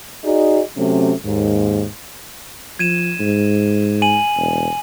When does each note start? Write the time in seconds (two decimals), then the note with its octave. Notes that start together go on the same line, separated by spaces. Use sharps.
0.24 D#4 F#4 G#4 D5 D#5
0.77 C3 F#3 A3 C#4
1.24 D#2 G#2
2.79 F3 G#6 D#7 E7
3.20 G#2
4.02 G#5 D#7 F#7
4.37 E1